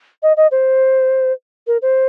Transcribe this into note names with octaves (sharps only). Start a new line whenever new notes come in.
D#5
D#5
C5
A#4
C5